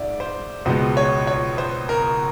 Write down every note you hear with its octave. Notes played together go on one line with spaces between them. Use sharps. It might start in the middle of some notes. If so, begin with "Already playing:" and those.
Already playing: G#2 D5 E5
C5
C#2 B2 G#3 B3 C5
C#5
C#5
C5
A#4